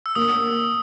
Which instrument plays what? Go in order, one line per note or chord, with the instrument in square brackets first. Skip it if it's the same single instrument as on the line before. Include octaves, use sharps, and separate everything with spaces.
[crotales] E6
[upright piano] A#3 [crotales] D#6